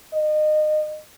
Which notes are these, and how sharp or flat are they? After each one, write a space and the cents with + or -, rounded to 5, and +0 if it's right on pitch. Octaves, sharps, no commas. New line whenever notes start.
D#5 -30